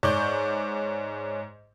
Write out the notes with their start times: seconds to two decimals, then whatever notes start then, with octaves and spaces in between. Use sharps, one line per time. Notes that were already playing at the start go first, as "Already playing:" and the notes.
0.03 G#2 C#5 D5 G6